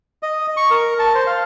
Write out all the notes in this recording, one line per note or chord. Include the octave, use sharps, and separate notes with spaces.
D#5
C#6
A#4
A5
C5
F5